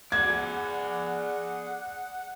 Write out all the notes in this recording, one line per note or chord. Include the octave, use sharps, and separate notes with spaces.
G#4 D5 F#5 G#6